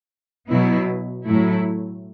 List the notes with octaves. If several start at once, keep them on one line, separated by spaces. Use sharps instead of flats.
B2 F#3 B3 E4
A2 F#3 A3 E4